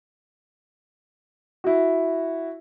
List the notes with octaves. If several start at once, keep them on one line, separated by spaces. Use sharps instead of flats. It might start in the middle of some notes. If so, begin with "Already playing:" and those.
E4 F#4